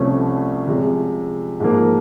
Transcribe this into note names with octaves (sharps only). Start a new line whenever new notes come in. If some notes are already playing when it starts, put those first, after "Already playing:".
Already playing: C2 C3 F3 A3 C#4
C3 F3 G#3
G#2 F3 A#3